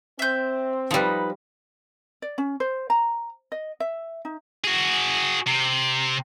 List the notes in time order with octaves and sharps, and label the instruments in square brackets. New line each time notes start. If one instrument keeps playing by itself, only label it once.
[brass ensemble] C4 [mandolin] E5 G6
[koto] F3 G3 [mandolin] D#4 B4
[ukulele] D5
C#4
C5
A#5
D#5
E5
D#4
[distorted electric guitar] F#4 G#4
C3